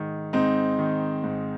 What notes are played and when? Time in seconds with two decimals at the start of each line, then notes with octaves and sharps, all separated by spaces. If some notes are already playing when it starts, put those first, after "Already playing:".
Already playing: G#2 D#3
0.33 G#2 C4 D#4
0.79 D#3
1.24 G#2